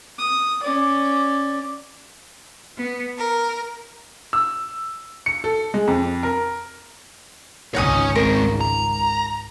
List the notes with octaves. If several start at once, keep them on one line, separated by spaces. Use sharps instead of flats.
D#6
C#4 D5
B3
A#4
E6
C#7
A4
G#3
F2
A#4
G#1 C#2 D#4 C#5 F#5 G#5 D#6
G#3 C4 A#4
A#5